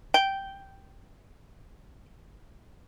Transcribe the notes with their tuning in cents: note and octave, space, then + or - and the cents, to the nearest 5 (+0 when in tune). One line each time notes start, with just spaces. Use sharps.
G5 -5